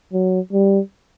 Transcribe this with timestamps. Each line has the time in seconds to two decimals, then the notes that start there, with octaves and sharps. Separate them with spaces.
0.13 F#3
0.52 G3